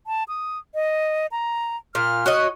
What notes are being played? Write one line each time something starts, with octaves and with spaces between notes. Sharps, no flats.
A5
D#6
D#5
A#5
A#2 F6
F#4 C#5 D#5